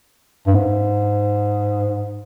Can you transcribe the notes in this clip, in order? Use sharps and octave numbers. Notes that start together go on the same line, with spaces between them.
G2
G#2